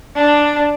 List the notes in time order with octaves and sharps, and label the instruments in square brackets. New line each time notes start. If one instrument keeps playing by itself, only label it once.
[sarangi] D4